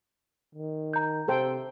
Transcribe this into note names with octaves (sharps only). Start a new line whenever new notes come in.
D#3
A#5 G6
C3 A4 C5 G5